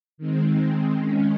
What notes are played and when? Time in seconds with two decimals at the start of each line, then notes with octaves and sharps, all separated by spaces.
0.18 D#3 G#3 C4
0.96 D#3 G#3 C#4